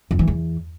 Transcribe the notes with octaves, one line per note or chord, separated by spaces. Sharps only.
F2
E3
E2